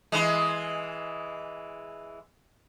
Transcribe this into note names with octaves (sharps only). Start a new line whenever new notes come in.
E3 G#3